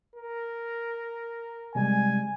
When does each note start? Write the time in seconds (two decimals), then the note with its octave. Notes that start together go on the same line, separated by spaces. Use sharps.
0.15 A#4
1.75 C3 G3 G#3 G#5